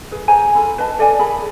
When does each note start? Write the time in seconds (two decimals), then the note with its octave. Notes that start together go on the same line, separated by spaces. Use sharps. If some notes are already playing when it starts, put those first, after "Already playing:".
0.11 G#4 B4
0.28 G#4 C5 G#5 A#5
0.55 F4 A4 B5
0.78 B4 D#5 A5
0.99 A4 D5 F5 G#5
1.19 G#4 A#4 B5